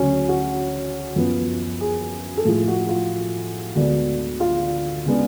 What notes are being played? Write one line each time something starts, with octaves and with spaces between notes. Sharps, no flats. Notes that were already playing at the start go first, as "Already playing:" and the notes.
Already playing: D2 C#3 F#3 C#4 C#5
F#4
F#2 F3 B3
G#4
A4
A2 F3 A3 G#4
F#4
F4
D2 D3 G#3 B3 D4
F4
C#3 G#3 B3 D4